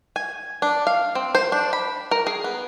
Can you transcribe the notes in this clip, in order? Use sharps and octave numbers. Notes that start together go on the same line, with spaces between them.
G#5
D4
F5
C4
C5
D4
B5
A#4
G#4
B3